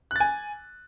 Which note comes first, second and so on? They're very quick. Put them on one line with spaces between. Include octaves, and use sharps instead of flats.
F#6 A6 G#5